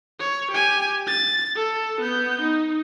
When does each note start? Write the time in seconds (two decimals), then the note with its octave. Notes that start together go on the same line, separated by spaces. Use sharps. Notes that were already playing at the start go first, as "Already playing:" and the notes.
0.20 C#5
0.51 G4 G#5
1.08 A6
1.56 A4
2.01 B3 G6
2.41 D#4